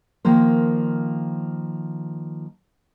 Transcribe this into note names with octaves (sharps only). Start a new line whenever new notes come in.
D#3 F3 A#3 C5